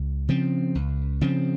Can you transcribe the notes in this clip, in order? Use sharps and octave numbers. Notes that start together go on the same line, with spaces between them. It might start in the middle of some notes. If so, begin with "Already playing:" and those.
Already playing: C#2
C#3 F3 C4
C#2
C#3 F3 C4